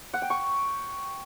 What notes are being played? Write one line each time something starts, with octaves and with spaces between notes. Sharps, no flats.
F#5
G5
C#6